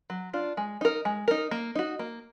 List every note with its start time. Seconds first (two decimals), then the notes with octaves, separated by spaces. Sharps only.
0.10 F#3
0.33 D4 F4
0.57 G#3
0.81 D#4 A#4
1.05 G#3
1.28 D#4 A#4
1.51 A#3
1.75 D#4 F#4
1.99 A#3